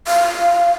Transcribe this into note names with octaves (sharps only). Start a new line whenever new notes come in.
F5